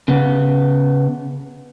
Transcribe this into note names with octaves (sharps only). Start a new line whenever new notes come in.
C#3 B3